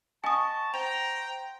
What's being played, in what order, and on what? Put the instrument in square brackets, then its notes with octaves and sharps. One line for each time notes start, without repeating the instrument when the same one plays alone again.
[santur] D#5 F#5 C#6 [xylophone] G#5 D#6 [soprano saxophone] A5
[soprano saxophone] C5 [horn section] G5 A#5 [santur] C6 [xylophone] F7